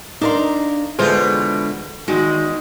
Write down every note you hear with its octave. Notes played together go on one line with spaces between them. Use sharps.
D4 D#4 A#4 F5 A#5 C6
B2 D3 E3 G#3 F4 G#4 C5
E2 D#3 G#3 F#4